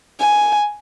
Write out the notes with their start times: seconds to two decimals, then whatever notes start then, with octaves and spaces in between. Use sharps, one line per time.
0.20 G#5